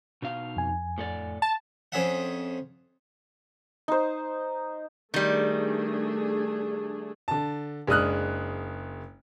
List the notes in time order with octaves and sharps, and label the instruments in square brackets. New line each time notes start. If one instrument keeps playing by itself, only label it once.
[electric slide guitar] B2 D#4 F5
[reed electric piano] F2 G#5
[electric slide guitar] A2 A4 D5
[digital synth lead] A5
[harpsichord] F2 C#4 G#4 E5 F#5
[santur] D#4 C5
[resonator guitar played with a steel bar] D#3 G3 [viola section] A3 D4 G#4
[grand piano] D3 A5
F#1 G#3 D4 D#6 F6 F#6